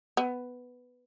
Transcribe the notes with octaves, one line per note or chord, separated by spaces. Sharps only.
B3